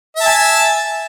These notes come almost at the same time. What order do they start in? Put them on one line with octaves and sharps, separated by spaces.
E5 A5 G#5